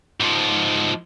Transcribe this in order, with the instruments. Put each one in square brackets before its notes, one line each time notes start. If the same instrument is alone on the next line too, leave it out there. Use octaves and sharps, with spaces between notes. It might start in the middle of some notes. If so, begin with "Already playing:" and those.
[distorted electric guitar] G#2 F3